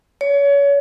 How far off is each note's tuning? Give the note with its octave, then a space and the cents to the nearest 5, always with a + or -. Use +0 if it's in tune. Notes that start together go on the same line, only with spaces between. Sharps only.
C#5 +30